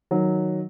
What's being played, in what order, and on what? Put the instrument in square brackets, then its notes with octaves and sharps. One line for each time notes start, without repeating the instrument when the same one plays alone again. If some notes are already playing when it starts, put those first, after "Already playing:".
[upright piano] D#3 F#3